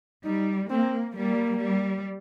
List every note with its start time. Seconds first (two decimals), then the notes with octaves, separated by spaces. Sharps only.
0.24 G3 D#4
0.70 A#3 C4
1.16 G3 A#3
1.61 G3